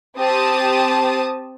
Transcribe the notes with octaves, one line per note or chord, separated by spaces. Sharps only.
C4 G4 A5 D#6